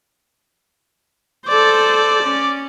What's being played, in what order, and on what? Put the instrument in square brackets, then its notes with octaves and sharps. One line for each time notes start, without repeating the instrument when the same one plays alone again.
[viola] A4 C5 [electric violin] D5
[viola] C#4